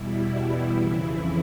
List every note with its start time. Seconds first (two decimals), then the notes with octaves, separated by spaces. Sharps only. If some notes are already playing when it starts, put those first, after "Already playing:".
Already playing: E2 B2 G3 E4
0.35 E4
0.80 F2 C#3 E3